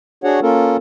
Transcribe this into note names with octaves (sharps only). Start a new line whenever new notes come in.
D4 F#4 G#4 C#5 F#5
A#3 C#4 F4 A4 A#4